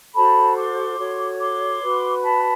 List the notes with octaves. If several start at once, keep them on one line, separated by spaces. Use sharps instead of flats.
F#4 A4 C5 A5 B5
C6 D6
F#4 A4 C#5
C6 D6
F#4 B4
A5 B5